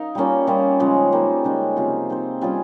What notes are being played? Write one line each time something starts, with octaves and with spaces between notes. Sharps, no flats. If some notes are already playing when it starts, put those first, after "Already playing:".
Already playing: D#4 A#4 F5
G3 A#3 C#4 F4
G3 C#4 F4 A#4
C#3 F3 G#3
G3 A#3 D#4
C#3 G#3 D#4
C3 F3 A#3 F4
C4 D#4 G#4 C5
G3 C#4 F4 G#4